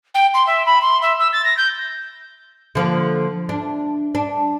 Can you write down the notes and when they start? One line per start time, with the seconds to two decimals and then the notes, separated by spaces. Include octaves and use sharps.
0.14 G5
0.34 C6
0.46 E5
0.66 B5
0.81 C6
1.01 E5
1.19 E6
1.32 A6
1.44 A#6
1.57 G6
2.75 D3 F3 A#3
3.49 D4
4.15 D4